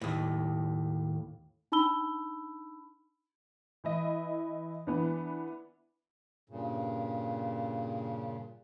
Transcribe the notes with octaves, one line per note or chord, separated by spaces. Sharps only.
D#2 A2
D4 D#4 A5 B5 E6 G7
E3 E4 D#5
E3 B3 D4
G2 A#2 C#3